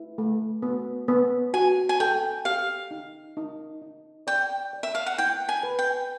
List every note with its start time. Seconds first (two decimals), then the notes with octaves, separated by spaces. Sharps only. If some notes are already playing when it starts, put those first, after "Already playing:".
Already playing: E4
0.18 A3
0.62 B3
1.08 B3
1.54 F#4 G#5
1.89 G#5
2.00 A4 G5
2.45 G4 F5
2.91 D#4
3.37 D#4
3.82 D#4
4.27 D5 G5
4.73 D5
4.83 E5
4.95 F5
5.06 F#5
5.18 E4 G5
5.49 G#5
5.63 B4
5.79 G5